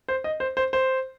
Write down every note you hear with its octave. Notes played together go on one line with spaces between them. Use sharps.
C5
D#5
C5
C5
C5